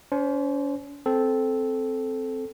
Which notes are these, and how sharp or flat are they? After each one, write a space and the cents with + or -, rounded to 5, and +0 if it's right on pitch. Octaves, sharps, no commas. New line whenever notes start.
C#4 +40 C5 +0
C4 +0 A4 -10